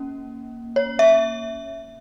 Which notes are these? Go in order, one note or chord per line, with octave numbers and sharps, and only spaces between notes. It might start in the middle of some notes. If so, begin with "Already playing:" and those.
Already playing: A#3 C#4
C#5
E5